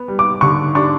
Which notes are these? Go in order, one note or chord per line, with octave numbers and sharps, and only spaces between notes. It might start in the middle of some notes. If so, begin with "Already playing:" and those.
Already playing: B3
G3
D6
D3 C#6
D4 C#6